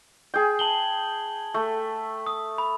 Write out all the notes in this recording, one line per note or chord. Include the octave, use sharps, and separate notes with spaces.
G#4 G5
A5 F#7 G7
A3
D#6
B5